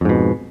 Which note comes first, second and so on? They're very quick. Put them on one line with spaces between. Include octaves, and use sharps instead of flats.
F2 G#2 B2